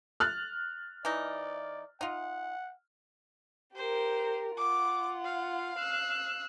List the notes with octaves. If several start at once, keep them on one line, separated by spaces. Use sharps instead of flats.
F6 F#6 A6
E3 D#4 D5
D#4 F4 F#5
G4 A#4 C5
F4 F#5 D6
F5
E6 F#6